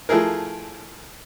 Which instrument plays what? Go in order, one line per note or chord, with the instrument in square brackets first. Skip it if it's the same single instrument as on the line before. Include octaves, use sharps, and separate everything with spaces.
[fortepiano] F3 A3 E4 G#4 A#4